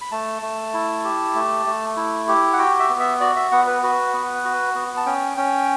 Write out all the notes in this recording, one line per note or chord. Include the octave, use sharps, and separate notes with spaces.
B5
A3 A5
A3
E4
G4
A3
A3
E4
G4
F#5
F#4 G5
E5
B3
E5
F#4 D5
E5
B3 F#5
B4
F#4 B4
B3
F#4
B3
A5
C#4 G5
C#4 G5